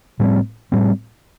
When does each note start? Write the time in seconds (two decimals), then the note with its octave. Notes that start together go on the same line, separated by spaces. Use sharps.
0.20 A2 G3 C4
0.72 A2 G3 C4